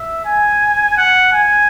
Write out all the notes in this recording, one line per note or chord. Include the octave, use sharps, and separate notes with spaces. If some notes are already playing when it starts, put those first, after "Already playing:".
Already playing: E5
G#5
F#5
G#5